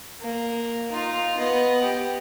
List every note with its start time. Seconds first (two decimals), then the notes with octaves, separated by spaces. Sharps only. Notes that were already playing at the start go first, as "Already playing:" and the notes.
0.21 A#3
0.92 D#4 F4
1.37 B3 D#5
1.82 G4